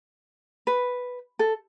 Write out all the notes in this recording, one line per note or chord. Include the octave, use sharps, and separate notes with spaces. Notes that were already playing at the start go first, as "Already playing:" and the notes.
B4
A4